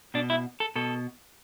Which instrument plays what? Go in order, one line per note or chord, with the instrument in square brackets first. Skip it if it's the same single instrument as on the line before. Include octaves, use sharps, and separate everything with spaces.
[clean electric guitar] B2 D4
E4
A4
B2 A4